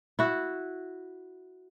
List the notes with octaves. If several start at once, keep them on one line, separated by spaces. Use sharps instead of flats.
E4 F#4